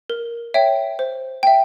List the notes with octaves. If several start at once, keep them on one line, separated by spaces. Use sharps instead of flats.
A#4
C#5 E5 G5
C5
E5 G5